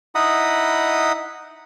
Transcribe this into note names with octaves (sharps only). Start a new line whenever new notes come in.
D#4 E4 D#5 F#5 B5 D#6